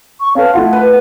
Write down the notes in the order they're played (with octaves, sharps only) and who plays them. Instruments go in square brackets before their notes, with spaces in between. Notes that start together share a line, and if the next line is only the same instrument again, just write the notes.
[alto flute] C#6
[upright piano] C#4 A4 B4 [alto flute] F5
[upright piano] A3 E4 F4 [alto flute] F#5
[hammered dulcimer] B4